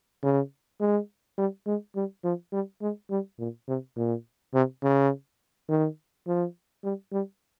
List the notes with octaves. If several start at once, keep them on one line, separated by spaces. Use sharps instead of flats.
C#3
G#3
G3
G#3
G3
F3
G3
G#3
G3
A#2
C3
A#2
C3
C#3
D#3
F3
G3
G3